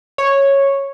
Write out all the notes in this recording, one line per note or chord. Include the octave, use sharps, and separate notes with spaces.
C#5